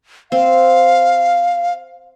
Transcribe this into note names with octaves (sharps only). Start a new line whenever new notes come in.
C4 F5